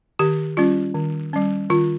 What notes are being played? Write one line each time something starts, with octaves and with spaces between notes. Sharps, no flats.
D#3 G4
G3 C#4 F4
D#3
G3 C#4
D#3 F4